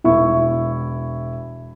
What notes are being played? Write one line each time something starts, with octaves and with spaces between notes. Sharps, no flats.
E1 E4 C#6